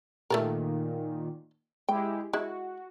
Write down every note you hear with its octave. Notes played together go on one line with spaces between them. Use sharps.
A#2 D#3 A3 A4 A#4
G#3 E4 G4 G5
G#3 E4 F#4